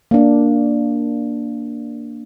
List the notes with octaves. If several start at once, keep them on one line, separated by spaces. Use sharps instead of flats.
A#3 D4